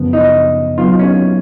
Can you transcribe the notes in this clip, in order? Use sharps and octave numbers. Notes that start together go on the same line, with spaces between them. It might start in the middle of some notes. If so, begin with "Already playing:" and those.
Already playing: F#2 C#3 F3 B3
D#4
F#3 B3 D#4 F4
C#4